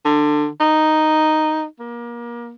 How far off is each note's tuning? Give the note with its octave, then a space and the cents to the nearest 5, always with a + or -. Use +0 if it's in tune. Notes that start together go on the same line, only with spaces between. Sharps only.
D3 +20
D#4 +0
A#3 +30